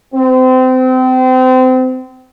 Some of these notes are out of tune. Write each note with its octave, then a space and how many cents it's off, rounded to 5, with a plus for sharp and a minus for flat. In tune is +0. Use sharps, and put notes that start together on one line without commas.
C4 -30